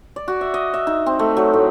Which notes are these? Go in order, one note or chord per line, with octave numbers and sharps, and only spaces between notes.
D5
F#4
E5
D#5
E5
D#4
C4
A3
F#3
A2